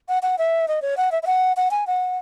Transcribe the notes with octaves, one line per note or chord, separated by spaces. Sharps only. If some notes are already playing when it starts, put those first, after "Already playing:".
F#5
F#5
E5
D#5
C#5
F#5
E5
E5
F#5
F#5
G#5
F#5